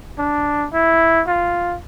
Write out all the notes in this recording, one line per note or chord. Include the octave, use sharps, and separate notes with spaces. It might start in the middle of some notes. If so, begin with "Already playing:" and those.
D4
E4
F4